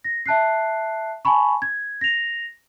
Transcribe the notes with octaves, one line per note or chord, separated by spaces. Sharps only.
A#6
E5 A5 F#6 C7
G#5 A5 B5 C#6
G#6
A#6 F7